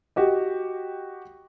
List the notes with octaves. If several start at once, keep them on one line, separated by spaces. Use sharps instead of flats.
F#4 G4 D#5